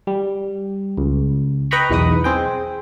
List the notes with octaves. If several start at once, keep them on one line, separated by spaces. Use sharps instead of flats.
G3
C#2
B4 D#5 G5 A#5 B5 C#6
B1 E2 D#4 B4 D#6
C4 G#4 G5